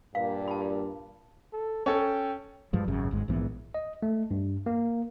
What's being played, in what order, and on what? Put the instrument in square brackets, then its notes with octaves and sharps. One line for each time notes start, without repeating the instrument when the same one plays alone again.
[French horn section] G2 A#2 A#4 [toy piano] F5
[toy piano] A5 B5
[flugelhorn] A4
[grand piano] C#4 A4 [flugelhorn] G5
[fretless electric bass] G2 F3 G#3
G#1 F#2 C#3
G#1 G#2 G#3
A#1 G#2 E3 B3
[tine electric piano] D#5
A3
G2
A#3